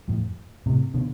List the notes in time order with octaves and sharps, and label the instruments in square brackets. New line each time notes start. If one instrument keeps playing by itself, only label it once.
[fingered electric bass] F2 A2
A2 C3
B2 D3